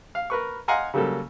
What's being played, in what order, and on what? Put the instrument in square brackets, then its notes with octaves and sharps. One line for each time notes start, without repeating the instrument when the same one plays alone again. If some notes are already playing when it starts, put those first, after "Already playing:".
[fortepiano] F5
A#4 B4 C#6
D#5 F5 F#5 G#5 A#5 C6
C#3 F#3 G3 A#3 A4